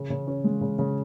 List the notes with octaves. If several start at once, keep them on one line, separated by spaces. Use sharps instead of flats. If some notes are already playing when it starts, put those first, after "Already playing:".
Already playing: C#3
C#3
C#4
G#3
C#3
C#3